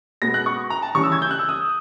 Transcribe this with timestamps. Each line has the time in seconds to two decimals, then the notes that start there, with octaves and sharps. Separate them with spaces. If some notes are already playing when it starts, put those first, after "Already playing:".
0.22 B2 G#3 B3 A#6
0.34 F#6
0.46 C#6
0.70 A#5
0.82 A5
0.95 C#3 E3 G3 C#6
1.04 E6
1.12 G#6
1.22 G6
1.31 F#6
1.39 E6
1.49 D#6